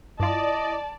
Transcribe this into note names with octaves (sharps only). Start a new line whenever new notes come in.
G2 E4 F4 D5 D#5 A5